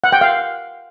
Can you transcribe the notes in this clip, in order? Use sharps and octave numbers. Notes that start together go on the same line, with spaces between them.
F#5
G5
F5